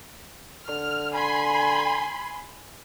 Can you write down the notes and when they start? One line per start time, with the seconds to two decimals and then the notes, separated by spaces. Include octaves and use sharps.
0.69 D3 F6
1.14 G#5 B5 C6